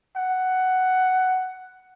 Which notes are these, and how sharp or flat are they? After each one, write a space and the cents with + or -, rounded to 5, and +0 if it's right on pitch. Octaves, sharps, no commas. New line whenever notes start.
F#5 +10